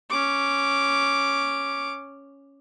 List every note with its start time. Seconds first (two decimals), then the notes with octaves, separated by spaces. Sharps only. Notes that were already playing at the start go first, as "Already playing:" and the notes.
0.10 C#4 D6